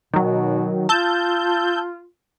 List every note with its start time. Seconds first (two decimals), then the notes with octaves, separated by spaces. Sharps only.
0.14 B2 D#3 F#3
0.89 F4 A5 E6 G6